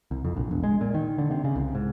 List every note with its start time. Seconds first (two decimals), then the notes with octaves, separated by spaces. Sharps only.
0.11 C2
0.25 F2
0.36 A#1
0.51 E1
0.64 G#3
0.81 A#2
0.94 D#3
1.18 D3
1.31 C3
1.44 C#3
1.56 C2
1.75 G#2